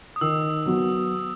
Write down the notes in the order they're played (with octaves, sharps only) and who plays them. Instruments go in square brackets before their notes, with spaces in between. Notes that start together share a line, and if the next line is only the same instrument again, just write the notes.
[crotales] D#6
[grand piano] D#3 [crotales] E6
[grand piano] F#3 B3 F#4